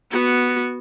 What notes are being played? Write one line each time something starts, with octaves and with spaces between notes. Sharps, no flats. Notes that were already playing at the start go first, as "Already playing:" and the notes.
B3 F#4